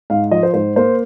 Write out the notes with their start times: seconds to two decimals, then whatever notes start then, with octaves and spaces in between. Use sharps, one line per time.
0.10 G#2 F5
0.31 F3 D#5
0.43 C5
0.54 G#2 C5
0.76 A#3 C5